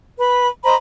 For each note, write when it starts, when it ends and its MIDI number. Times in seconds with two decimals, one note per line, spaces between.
0.18 0.47 71
0.18 0.47 83
0.64 0.74 72
0.64 0.74 75
0.64 0.74 82
0.64 0.74 83